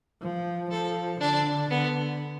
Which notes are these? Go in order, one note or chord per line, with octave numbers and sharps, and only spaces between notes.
F3
F3 A4
D3 D4
D3 B3